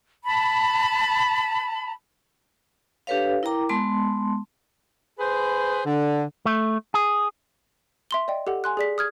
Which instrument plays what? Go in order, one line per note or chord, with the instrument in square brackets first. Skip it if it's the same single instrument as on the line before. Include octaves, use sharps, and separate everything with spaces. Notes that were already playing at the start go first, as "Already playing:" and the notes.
[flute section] A5 B5
[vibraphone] D4 G4 A4 B4 C#5 F5
E4 A#4 G5 A#5 D6
G#3 B3 A5 C6
[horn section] G#4 B4 C5
D3
[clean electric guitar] A3
G#4
[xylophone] E5 C6 G7
D5 D#5 G5
G4 A4 F#5
G#5 C6 F#6
G#4 D5 B6
D#6 F6 G#6